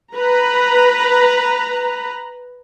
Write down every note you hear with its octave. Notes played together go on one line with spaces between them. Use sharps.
B4 A#5